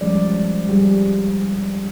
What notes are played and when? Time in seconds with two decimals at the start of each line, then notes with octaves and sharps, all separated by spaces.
0.01 F3 G3 G#3 C#4 D5
0.69 G3 G#4